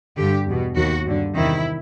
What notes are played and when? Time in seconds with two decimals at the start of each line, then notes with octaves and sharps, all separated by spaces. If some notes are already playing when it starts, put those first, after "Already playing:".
0.17 G2 D3 G4
0.47 E2 B2
0.76 D#2 D#3 F#4
1.06 G2 D3
1.35 E2 C3 D#3 E4